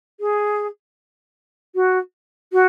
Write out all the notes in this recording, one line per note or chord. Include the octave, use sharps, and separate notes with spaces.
G#4
F#4
F#4